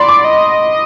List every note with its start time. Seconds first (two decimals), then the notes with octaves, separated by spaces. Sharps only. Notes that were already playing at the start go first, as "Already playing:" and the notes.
Already playing: D5 B5 C6
0.09 D6
0.24 D#5